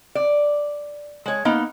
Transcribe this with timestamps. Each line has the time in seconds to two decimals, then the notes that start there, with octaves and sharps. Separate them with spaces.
0.15 D5
1.26 G#3 C#5
1.45 A#3 B3 D#4